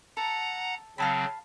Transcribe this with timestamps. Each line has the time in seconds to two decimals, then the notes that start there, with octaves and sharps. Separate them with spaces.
0.17 A4 F#5 A#5
0.98 C#3 F#3 C4 F5 A5 B5